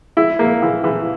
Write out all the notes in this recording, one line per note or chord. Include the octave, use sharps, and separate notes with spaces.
E4
A#3
E3
E3